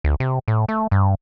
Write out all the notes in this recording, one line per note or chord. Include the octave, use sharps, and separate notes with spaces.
D2
C3
A2
A3
G2